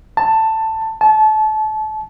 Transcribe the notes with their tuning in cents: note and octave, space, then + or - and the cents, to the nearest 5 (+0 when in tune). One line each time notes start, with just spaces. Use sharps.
A5 +10
A5 -30